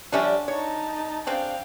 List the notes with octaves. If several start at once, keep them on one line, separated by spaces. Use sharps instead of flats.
D3 F3 G3 C#4 D4 E5
D#4 C#5 A5
C#3 C4 D4 F5 G5